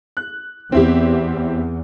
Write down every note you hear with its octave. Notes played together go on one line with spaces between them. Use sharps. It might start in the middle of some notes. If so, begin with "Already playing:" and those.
F#6
E2 C4 E4 G4